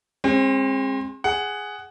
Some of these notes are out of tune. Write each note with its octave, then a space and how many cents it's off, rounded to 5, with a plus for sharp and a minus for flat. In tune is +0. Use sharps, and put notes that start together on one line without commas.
G#3 -20 C4 +35
G#4 +0 F#5 +10